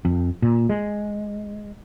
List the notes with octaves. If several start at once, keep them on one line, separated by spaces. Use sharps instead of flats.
F2
A#2
G#3